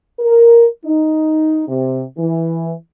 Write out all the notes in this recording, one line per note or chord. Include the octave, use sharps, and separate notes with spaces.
A#4
D#4
C3
E3